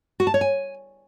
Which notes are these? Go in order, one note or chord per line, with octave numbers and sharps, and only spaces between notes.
F#4
A5
C#5
G#5